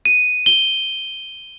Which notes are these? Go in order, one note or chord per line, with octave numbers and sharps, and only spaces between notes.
D#7
G7